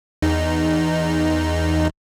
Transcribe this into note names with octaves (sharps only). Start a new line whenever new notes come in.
E2 D#4